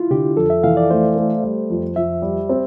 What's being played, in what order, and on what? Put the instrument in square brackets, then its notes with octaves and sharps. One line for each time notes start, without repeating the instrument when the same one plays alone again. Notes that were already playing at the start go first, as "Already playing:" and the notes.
Already playing: [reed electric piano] E4 F4
[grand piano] D3 [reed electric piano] G4
[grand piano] F2 [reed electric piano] A4
[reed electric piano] E5
[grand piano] E3 [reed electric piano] F5
[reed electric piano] D5
[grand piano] A3 [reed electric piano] C5
[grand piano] A3
G3
F2
[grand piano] F2 [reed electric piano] E5
[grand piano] G3
C4